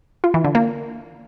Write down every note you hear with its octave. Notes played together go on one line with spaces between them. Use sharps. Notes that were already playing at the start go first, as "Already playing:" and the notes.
F4
E3
D3
A#3